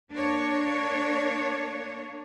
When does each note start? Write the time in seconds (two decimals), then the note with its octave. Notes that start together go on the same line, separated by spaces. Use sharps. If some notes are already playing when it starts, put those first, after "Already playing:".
0.11 A#3 D4 C#5